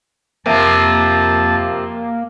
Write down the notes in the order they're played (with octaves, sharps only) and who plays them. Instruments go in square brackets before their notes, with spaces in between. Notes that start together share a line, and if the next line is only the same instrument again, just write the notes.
[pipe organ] F2 A5 [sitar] C3 F3 [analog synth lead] A#3